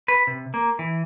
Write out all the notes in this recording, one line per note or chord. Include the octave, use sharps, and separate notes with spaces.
B4
C3
A#3
E3